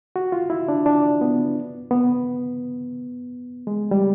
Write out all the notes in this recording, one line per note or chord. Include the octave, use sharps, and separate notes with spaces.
F#4
F4
E4
D4
D4
B3
B3
G#3
G3